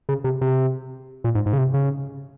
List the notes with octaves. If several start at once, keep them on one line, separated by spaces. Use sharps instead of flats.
C#3
C3
C3
A#2
G#2
G#2
C#3
C3
C#3